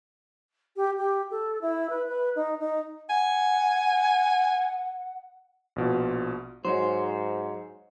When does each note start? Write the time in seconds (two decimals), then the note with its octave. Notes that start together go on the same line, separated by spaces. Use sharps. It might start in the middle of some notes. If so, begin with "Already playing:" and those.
0.76 G4
0.99 G4
1.31 A4
1.61 E4
1.90 B4
2.08 B4
2.35 D#4
2.60 D#4
3.09 F#5 G#5
5.76 A#1 B2 F4
6.65 G#2 F#3 D#4 C5 C#5